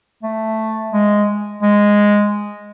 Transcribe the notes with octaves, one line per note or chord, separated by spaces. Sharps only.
A3
G#3
G#3